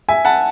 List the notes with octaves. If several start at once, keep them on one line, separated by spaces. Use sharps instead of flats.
E5 G#5
F#5 A5